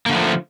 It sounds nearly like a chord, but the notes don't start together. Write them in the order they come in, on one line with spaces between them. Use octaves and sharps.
A#3 D3 A3 F3